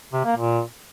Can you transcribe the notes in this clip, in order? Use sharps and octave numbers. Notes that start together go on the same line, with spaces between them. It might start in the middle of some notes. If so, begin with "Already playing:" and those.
C3
A#3
A#2